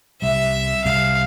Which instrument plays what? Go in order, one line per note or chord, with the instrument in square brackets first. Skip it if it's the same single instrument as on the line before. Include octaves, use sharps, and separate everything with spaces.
[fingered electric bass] C2 C3 G3 [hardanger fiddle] E5
[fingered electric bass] C2 C3 G3 [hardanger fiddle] F5